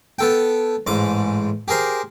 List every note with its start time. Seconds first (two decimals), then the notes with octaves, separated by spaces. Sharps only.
0.19 B3 A4 G5
0.87 A1 G#2 D6
1.68 G4 G#4 A#4 C5